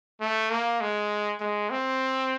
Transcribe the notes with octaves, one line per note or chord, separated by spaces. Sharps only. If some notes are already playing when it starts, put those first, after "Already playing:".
A3
A#3
G#3
G#3
C4